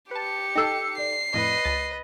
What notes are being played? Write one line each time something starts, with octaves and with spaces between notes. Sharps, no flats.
G4 B4 A5 C#7
D#4 A4 G5 E6 C7
D5 C7
F2 A2 B4 D#5
C#2 A6